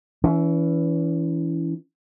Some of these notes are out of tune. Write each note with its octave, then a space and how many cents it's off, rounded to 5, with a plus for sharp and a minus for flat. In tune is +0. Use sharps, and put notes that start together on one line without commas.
E3 +0 C#4 +35